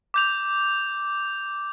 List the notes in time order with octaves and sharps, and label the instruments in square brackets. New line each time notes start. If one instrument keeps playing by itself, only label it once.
[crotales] D6 G6 F7